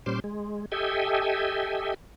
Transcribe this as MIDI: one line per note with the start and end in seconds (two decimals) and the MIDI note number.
0.06 0.20 46
0.06 0.20 55
0.06 0.20 61
0.06 0.20 72
0.06 0.20 84
0.06 0.20 86
0.24 0.66 56
0.72 1.94 67
0.72 1.94 69
0.72 1.94 75
0.72 1.94 76
0.72 1.94 79
0.72 1.94 80